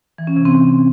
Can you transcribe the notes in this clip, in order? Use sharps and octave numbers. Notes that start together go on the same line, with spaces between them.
E3
C#4
C3
C4